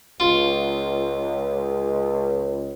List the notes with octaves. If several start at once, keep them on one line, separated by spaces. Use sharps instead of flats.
C#2 F4